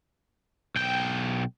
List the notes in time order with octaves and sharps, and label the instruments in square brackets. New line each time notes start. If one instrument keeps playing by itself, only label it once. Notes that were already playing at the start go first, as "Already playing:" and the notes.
[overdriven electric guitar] B1 G5